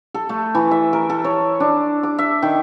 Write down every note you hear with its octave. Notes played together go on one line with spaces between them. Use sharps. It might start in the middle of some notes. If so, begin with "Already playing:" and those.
A4
A3
E3
E5
A#4
A4
C#5
D4
D6
E5
D#3